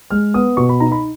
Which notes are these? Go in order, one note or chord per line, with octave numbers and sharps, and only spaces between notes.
G#3 F6
B3 D#6
B2 C#6
B5
D#4 A#5
B5